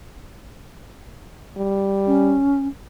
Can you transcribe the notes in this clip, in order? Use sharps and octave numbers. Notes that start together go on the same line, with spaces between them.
G3
C#4